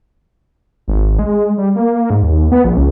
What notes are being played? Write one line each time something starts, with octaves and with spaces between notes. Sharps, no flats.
G#1
G#3
G3
A#3
G#2
D#2
B3
A#1
C#2